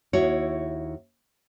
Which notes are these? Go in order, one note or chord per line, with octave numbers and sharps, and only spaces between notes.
D#2 E4 F#4 C#5